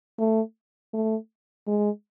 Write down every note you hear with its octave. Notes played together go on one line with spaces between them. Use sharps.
A3
A3
G#3